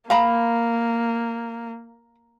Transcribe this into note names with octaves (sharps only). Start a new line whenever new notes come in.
A#3 F5 A#5 B5